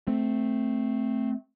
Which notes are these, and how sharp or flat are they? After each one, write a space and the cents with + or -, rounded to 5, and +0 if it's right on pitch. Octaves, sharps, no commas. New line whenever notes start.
A3 +0 C4 +0